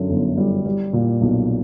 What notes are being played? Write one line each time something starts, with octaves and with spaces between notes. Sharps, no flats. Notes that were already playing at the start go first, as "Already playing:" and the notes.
Already playing: F#2 D3
G1
G3
G3
A#2
B1